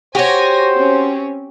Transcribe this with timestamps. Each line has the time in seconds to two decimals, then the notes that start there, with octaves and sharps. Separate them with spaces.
0.15 F#4 G4 C5 C#5 G#5 A#6
0.74 C4 C#4